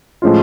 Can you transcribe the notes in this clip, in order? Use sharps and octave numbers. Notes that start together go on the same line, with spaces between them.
A2 F3 G#3 C#4 F4